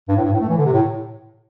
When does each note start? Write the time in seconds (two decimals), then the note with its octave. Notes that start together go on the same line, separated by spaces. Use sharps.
0.09 G2
0.17 A2
0.24 G2
0.33 A2
0.41 A3
0.49 E3
0.57 D3
0.65 C3
0.73 A2